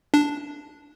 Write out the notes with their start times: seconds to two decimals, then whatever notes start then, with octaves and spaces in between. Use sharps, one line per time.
0.14 D4